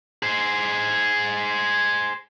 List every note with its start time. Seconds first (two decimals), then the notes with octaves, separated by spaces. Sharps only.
0.23 G#4 C5